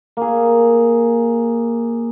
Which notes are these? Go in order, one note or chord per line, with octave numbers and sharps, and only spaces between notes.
A#3 G#4